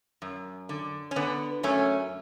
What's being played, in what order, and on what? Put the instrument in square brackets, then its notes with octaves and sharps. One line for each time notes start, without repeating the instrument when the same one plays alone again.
[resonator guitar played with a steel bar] F#2
D3
C#4
D3 B3
F#2 A3 C#4